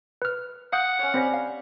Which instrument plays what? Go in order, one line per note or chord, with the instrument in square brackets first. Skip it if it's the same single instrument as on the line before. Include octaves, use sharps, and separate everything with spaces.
[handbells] B4 F6
[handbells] F5 D#6 G6 [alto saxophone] F#5
[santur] C#4 C#5
[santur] G3 [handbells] C4 C5 A#6
[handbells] F5